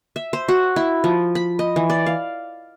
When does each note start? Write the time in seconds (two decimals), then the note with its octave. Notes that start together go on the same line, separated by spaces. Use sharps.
0.16 E5
0.33 C5
0.48 F#4
0.76 E4
1.04 F3
1.35 B5
1.59 D#5
1.76 E3
1.90 D5
2.06 F5